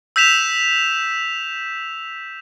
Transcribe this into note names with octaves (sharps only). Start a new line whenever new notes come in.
E6 G6 B6 E7 F7